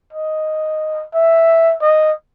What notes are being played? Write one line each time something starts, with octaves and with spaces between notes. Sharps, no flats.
D#5
E5
D#5